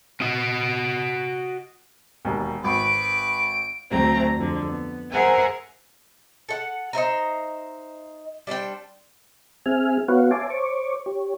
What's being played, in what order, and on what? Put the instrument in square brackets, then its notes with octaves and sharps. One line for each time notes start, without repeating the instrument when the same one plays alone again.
[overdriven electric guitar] F#4 D#5
[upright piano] E1 D#2
[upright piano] G#1 [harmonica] B4 [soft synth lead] D7
[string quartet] D2 F#3 A3 C4 A#5
F2 D3
B3
G#4 A#4 C5 E5 F#5 G#5
[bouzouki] A4 F#5
D#4 C5 E5 A#5
G3 D4 C5 G5
[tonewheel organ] C4 G#4 E5 G#5 F6
B3 F#4 B4 C#5 F5 F#5
C#5 E5 G#5 A5 C6 D6
C5 C#5 C#6 D6
G4 C#5